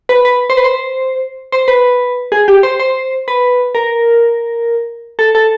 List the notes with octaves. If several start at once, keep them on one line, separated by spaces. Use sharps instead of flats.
B4
B4
C5
B4
C5
C5
B4
G#4
G4
C5
C5
B4
A#4
A4
A4